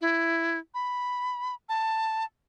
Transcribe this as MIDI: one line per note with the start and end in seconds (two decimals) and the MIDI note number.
0.01 0.59 64
0.74 1.55 83
1.69 2.25 81